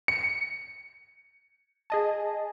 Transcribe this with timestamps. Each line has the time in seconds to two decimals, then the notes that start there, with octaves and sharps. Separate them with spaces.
0.08 C#7
1.90 G#4 D#5 A5